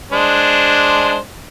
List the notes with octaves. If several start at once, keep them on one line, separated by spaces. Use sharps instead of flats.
G#3 D4 C5